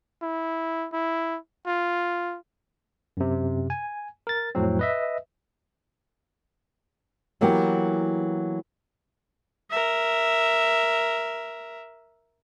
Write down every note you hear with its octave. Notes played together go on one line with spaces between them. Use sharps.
E4
E4
F4
F#2 C3
G#5
A#4 A6
F2 A2 F#3 C4
B4 D#5 E5
E3 F#3 A#3 B3 G4
A#4 E5